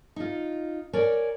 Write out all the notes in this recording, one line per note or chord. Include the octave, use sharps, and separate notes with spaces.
D#4 F4
A#4 C#5 D5 G#5